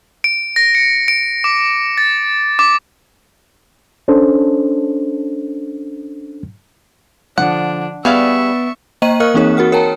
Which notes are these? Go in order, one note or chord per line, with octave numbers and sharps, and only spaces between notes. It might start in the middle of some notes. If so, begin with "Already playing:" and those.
D7
A#6
C#7
D7
D6
A6
D6
C#4 D4 A4 C5
D3 F3 D4 F#5
G3 B3 G#4 D5 E5 F5 C#6
A#3 C5 D#5 G5 A#5 D#7
A#4 D#5 F5 C#6 F6 F#6
E3 A#3 C4 D#4 G#4 C#5
F#4 A#4 F#5 F6
A#4 C#5 G5 A5 A#5